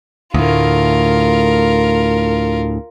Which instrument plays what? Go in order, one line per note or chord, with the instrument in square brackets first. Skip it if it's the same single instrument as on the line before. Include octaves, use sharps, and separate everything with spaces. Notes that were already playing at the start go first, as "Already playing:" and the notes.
[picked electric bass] D2 A2 [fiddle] F4 A#4